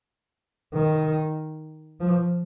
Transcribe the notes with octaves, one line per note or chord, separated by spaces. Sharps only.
D#3
F3